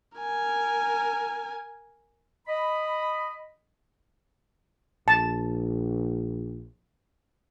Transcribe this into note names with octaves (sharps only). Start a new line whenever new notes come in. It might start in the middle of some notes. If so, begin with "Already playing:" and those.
A#4 G#5
D#5 B5
A#1 A5